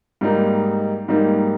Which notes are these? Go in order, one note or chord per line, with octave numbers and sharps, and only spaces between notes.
G#2 G3 A#3 D#4
G#2 G3 A#3 D#4